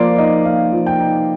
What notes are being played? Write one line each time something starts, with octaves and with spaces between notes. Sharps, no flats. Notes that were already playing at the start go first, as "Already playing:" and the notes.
Already playing: F3 A#3 D5 C6
D#4 D#5
A#3 F5
F3
G5
D#4